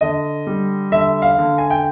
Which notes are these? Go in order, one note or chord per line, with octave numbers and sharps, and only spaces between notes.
D3 D#5
G3
D3 E5
F5
D3
G#5
G5